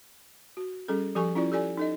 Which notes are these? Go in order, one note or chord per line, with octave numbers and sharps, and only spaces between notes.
F#4
G3 C#4 G#4 A4
F3 G4 A4 G#5 C#6
C#4 E4 F4 D5
G4 A4 D5 G#5
D#4 A4 D#5